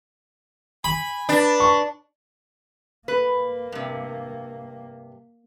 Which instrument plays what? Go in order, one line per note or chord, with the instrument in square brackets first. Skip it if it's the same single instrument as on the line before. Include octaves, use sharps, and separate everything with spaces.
[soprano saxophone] G#5 [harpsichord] B5
[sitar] D4 [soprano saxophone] B4
[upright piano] C#6
[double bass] A#3 [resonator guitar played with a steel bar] B4
[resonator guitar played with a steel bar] G2 C3